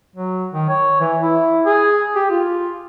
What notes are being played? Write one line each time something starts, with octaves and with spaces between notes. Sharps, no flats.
F#3
D#3
C#5
E3
E4
G#4
G4
F4